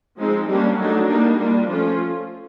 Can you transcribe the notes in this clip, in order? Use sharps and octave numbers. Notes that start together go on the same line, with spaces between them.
F3 G#3 C4 D#4
G3 A#3 C#4 D4
F#3 A3 D4 D#4
G3 A#3 D4 D#4
G3 A#3 D4 F4
F3 A3 C#4 F4